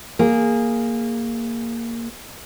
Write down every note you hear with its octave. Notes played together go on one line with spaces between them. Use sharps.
A#3 G#4